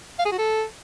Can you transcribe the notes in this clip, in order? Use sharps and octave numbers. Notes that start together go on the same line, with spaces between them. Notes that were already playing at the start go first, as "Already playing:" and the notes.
F5
G#4
F#4
A4